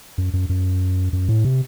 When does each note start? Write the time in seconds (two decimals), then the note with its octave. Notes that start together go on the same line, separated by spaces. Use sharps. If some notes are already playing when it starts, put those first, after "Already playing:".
0.18 F#2
0.34 F#2
0.49 F#2
1.13 F#2
1.29 A2
1.45 C3